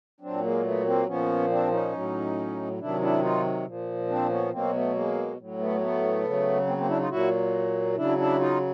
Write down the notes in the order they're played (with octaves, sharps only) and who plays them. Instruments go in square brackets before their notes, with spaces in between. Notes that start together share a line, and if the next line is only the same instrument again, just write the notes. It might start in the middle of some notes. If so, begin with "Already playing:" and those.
[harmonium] A#2 F#3 C4 D4
G#3 A#3
A3 B3
A#3 C4
A#2 F3 B3 C#4
C4 D4
C#4 D#4
A2 F#3
C3 D#3 F#3 D4 E4
D4 E4
D#4 F4
A#2 F3
C4 D4
B3 C#4
B2 F#3 A#3 C4
A3 B3
G#3 A#3
A2 F#3
A3 B3
A3 B3
C#3 F#3
A#3 C4
A#3 C4
D4 E4
D#4 F4
A#2 F#3 E4 F#4
C#3 F#3 D4 E4
D4 E4
D#4 F4